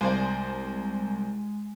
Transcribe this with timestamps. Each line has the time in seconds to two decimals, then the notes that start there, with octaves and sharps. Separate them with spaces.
0.01 C2 G#3 C5 D5 G#5